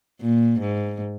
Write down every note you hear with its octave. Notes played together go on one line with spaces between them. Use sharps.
A#2
G#2